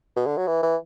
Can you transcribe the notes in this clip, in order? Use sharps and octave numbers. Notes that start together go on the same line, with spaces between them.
B2
D3
F#3
E3
E3